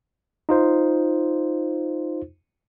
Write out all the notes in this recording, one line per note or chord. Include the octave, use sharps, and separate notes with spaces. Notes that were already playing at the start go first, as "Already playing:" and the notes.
D#4 F4 C5